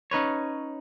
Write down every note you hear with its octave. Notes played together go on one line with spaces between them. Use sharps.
C#4 D#4 B4 C#5